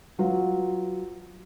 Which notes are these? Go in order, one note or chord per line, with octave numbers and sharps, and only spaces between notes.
F#3 F4 B4